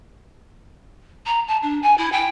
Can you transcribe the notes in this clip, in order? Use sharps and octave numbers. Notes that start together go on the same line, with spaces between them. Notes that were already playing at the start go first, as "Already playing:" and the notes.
A#5
A5
D4
G#5
E4
G5